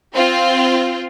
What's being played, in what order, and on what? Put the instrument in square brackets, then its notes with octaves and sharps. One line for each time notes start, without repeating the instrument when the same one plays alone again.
[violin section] C4 F4